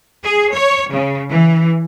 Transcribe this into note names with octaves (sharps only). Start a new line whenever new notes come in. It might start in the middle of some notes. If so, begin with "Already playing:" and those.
G#4
C#5
C#3
E3